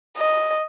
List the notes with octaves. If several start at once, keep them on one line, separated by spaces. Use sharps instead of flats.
D#5